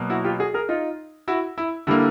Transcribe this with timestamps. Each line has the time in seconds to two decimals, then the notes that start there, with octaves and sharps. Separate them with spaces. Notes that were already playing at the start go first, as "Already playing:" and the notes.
Already playing: B2 F#3 A#3
0.10 E4 F#4
0.24 F4 G4
0.39 F#4 G#4
0.54 G#4 A#4
0.69 D#4 F4
1.28 E4 F#4
1.58 E4
1.87 D3 G3 A#3 E4